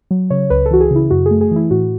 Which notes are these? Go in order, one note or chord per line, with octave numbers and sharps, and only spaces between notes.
F#3
C#3 C#5
C#2 B4
A4
E3 F#4
G#4
C#3 E4
F#2 F#4
A3 G#4
G#4
E3 E4
A2 F#4